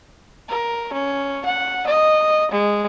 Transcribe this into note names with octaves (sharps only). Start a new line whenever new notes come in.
A#4
C#4
F#5
D#5
G#3